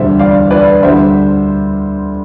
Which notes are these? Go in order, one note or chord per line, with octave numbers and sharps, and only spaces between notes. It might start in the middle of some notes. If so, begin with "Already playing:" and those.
Already playing: E1 D2 D3 G3 C5 E5
D5 F5
B4 D5
D2 D3 G3 C5 E5